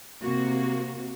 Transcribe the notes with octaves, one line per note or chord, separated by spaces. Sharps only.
C3 A#3 F#4